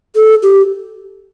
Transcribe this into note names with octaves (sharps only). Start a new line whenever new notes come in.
A4
G4